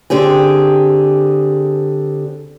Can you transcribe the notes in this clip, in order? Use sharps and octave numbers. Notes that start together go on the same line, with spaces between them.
D3 C4 G4 G#4